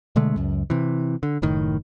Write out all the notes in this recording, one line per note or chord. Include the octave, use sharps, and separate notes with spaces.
B2 D3 G#3 A3
C#2 F#2
C3 E3
D3
F#1 A2 D#3